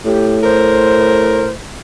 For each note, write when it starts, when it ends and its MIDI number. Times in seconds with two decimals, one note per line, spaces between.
0.05 1.56 45
0.05 0.42 67
0.43 1.47 70
0.43 1.50 72